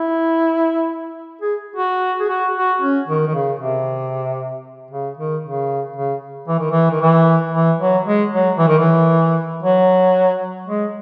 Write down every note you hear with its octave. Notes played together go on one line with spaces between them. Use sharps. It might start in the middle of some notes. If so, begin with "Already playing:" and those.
Already playing: E4
G#4
F#4
G#4
F#4
F#4
C#4
D#3
D#3
C#3
C3
C#3
D#3
C#3
C#3
E3
D#3
E3
D#3
E3
E3
F#3
G#3
F#3
E3
D#3
E3
F#3
G#3